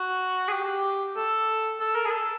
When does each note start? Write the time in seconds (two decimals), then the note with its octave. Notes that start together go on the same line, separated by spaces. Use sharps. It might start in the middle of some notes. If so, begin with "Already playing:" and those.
Already playing: F#4
0.48 G#4
0.53 G4
1.16 A4
1.80 A4
1.95 A#4
2.05 G#4
2.10 A4